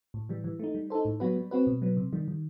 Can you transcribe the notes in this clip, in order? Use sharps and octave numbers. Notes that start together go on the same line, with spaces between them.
A2
E3 G3
E3
A3 D#4
G3
D#4 A4 C5
A2
F#3 B3 F#4 B4
G3
C4 F#4 B4
B2
F#3 B3
C3
D#3 G3
D#3